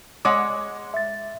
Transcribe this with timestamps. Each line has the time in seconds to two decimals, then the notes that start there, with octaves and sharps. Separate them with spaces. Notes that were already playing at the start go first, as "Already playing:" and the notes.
0.25 G#3 C#5 F#5 D6
0.94 E5 A6